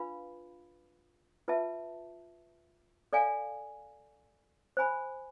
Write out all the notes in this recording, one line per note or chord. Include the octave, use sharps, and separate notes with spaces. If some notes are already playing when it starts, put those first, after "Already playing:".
Already playing: D4 F4 B4 F5 B5
F4 B4 E5 A5
A4 D5 F5 G#5
C5 G#5 B5